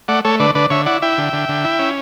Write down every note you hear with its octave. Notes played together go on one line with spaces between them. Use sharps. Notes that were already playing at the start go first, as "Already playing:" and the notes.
A3 D5 F#5
A3 A4 C#5
D3 B4 D5
D3 B4 D5
D3 C#5 E5
E4 D5 F#5
E4 E5 G5
D3
D3
D3
E4
C#4